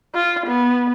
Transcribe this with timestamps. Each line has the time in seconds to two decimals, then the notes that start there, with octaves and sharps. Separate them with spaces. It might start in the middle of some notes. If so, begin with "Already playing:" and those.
0.15 F4
0.47 B3